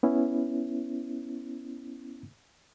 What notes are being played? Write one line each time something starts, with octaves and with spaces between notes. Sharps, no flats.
B3 C#4 E4